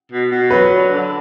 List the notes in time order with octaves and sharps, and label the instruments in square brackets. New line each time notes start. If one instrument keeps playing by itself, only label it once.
[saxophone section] B2
B2
[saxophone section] F#3 [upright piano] B4
[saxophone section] D3
D3